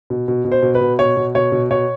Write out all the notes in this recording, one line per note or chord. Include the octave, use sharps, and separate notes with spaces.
B2
B2
B2
C5
B2
B4
B2
B2 C#5
B2
B2 C#5
B2
B2 C#5